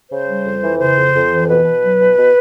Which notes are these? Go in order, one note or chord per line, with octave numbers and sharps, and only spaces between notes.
C#3 C5
G3
F2
E3
C#3 C5
F2
F2
E3
B2 B4
B2
F#3
B2
B2